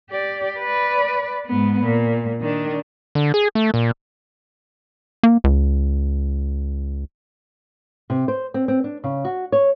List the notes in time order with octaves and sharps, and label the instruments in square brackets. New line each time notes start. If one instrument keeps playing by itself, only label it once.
[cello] G4 D5
B4 D5
G#2 B3
A#2
D#3 D4
[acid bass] D3
G#4
A3
A#2
[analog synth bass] A#3
C#2
[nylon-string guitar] C3
C5
C4
C4
D4
C#3
F#4
C#5